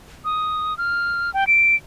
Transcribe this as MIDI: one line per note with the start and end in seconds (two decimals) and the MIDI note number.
0.25 0.76 87
0.78 1.33 89
1.34 1.47 79
1.47 1.75 98